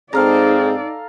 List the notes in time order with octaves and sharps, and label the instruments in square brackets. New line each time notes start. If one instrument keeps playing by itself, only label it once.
[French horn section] G#2 C4 [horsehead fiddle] D#4 D5 [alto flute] G#4 [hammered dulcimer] A4 F5 A#5